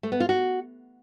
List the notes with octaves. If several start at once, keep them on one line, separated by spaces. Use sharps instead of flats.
A3
B3
F4
F#4